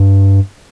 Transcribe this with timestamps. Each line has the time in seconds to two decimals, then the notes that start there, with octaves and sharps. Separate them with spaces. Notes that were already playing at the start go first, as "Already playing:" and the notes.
Already playing: G2